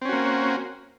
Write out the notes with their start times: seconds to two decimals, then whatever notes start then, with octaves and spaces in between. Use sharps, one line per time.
0.01 C4
0.05 C#4
0.09 F#4
0.13 A#3